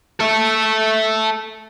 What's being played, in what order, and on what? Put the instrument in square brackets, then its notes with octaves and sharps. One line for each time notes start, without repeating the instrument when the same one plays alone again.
[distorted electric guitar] A4 E5